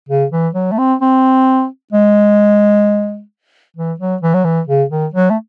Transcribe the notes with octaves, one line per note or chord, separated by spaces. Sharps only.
C#3
E3
F#3
A3
C4
C4
G#3
E3
F#3
E3
F#3
E3
C#3
D#3
F#3
A3